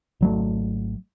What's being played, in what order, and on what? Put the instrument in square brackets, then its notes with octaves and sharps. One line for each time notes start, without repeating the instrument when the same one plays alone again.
[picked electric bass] G#1 F#3 A3